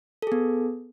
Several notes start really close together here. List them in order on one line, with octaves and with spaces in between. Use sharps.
A4 G#4 B3